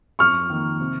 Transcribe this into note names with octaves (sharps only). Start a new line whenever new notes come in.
F2 C#6 F6
D#3 A#3
C3